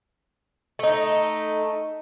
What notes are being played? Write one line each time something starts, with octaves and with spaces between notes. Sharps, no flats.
A3 D#4